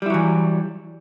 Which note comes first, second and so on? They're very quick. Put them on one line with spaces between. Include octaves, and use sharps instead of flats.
G3 E4 F#3 E3